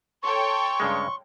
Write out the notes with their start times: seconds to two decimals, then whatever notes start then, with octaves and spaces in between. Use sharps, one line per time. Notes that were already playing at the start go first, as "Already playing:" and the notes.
0.23 A4 C#5 G5 C6 C#6
0.80 G2 C#3 G#3